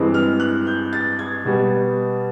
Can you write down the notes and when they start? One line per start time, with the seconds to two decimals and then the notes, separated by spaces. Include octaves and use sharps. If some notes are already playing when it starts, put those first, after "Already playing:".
Already playing: G2 E3 G#3 C4
0.14 F6
0.40 F#6
0.67 G6
0.93 A6
1.19 G#6
1.45 B2 G3 B3